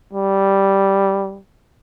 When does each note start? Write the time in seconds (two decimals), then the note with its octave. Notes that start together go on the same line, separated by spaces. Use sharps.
0.13 G3